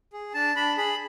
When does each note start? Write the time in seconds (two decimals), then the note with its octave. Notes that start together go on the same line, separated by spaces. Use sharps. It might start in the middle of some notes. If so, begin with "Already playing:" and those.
0.13 G#4
0.34 D4 A5
0.56 D4 B5
0.77 G#4 B5